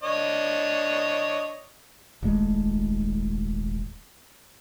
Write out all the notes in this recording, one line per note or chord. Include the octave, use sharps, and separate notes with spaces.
D4 C#5 D#5
D#1 G#1 G#3 A3